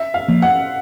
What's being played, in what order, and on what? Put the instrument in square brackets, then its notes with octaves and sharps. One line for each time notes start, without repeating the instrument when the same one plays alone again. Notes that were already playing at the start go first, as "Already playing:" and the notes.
Already playing: [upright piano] E5
F5
[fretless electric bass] F3 A#3
[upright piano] F#5